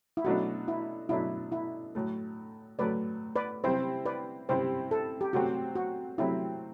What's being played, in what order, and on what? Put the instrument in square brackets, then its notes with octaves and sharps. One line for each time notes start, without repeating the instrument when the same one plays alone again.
[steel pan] E4
[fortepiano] B2 F#3 A3 D4 [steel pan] F#4
[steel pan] E4
[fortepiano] B2 F#3 A3 D4 [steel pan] E4
[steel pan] E4
[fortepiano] A2 F#3 A3
[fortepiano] A2 F#3 A3 [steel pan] B4 D5
[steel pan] B4 D5
[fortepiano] C3 G3 C4 E4 [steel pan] C5
[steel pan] B4 D5
[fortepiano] C3 G3 C4 E4 [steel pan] C5
[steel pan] A4
G4
[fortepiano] C3 F#3 A3 C4 [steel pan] F#4
[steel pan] F#4
[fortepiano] C3 F#3 A3 C4 [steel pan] E4